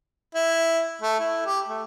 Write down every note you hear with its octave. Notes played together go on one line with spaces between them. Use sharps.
E4
A3
E4
G4
A3